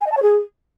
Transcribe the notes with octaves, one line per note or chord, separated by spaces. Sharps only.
G#5
D#5
A5
C#5
G#4